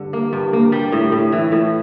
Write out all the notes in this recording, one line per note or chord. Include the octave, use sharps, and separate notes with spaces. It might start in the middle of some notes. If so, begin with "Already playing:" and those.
Already playing: G2 D3
A#3
G2
A#3
G3
A2
A2
E3
A2